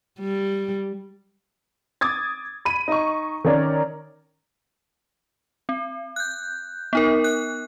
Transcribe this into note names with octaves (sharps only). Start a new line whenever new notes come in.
G3
D6 D#6 G#6 A6
B5 D#7
D#4 C#6
D#3 C#4 A#4 C#5 D5
C4
F#6 G6
B3 D#4 A#4
F#6